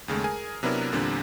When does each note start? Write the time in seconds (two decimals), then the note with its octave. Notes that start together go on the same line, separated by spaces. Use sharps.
0.08 D#2 C#3 G#3 A3
0.24 G#4 A#4 G#5
0.63 C3 F#3 B3 D4 E4 A#4
0.92 E2 A#2 D3 G3 C4 D4